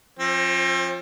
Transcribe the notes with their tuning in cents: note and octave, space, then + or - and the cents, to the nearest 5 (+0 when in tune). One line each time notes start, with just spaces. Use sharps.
F3 +5 C4 +40